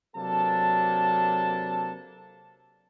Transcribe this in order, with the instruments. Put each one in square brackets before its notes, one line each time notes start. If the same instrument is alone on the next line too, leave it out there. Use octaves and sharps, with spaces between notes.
[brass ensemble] C3 F#3 A#3 D4 A4 A5